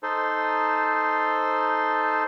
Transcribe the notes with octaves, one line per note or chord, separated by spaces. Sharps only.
D#4 A4 C5